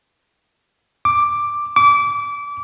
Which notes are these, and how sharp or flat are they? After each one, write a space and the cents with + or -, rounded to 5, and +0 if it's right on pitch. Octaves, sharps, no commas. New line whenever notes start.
D6 +5
D6 -25